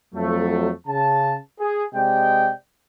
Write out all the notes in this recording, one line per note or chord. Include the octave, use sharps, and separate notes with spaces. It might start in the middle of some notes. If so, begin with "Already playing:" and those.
F2 F#3 A3
C#3 A5
G#4
C3 G#3 D5 D#5 G5